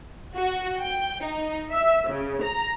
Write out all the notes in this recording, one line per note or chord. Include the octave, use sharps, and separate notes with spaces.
F#4
G5
D#4
E5
C#3
A#5